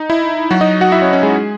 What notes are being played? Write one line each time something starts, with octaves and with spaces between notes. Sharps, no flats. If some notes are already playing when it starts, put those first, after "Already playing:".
Already playing: D#4
E4
F#3 F#4
D#4 D#5
F#4 F#5
E4 E5
C#4 C#5
C#4 C#5
G#3 G#4